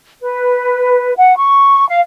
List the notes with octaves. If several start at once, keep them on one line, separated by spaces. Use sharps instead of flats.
B4
F#5
C#6
F5